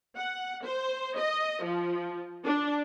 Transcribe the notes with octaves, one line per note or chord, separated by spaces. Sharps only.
F#5
C5
D#5
F3
D4